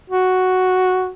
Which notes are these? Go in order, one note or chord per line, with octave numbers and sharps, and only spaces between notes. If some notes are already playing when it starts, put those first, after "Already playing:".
F#4